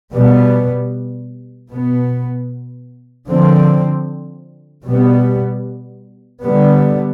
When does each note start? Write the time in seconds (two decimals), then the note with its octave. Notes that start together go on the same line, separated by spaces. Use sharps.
0.13 B2 G3 B3
1.70 B2 B3
3.27 D3 F3 C4
4.85 B2 G3 B3
6.42 D3 G3 B3